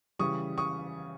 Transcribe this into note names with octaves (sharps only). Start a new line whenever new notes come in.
C#3 E3 G3 C#6 D#6
C#6 D#6